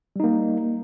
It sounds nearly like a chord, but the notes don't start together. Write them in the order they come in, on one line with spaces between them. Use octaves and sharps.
G3 D#4 A#3